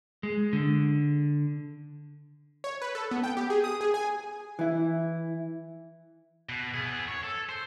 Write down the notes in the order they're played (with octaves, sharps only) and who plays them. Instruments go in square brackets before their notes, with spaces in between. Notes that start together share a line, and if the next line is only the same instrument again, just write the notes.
[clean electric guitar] G#3
D3
[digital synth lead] C#5
B4
A4
B3
G5
G4
G#4
D#6
G#4
G#5
[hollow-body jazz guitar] E3 E4
[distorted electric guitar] B2
B3 G#4
C#5
A4
C5